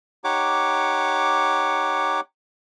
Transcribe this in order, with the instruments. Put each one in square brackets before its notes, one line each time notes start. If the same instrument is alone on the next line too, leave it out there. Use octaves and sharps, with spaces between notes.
[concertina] D#4 G4 C#5 F#5 D6